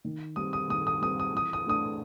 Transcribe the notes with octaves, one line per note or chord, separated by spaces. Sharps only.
D#3
G3 C4 D#6
D#6
D#3 D#6
D#6
G3 C4 D#6
D#6
E3 D#6
D#6
A3 D4 D#6